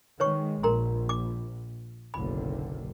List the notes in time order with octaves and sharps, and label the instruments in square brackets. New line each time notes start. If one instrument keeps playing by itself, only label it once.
[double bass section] D#3 G#3 [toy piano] B4 C#5 C#6
[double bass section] A#1 [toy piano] A#4 A#5 C6
[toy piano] D6
[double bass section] F#1 B1 D3 [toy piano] B5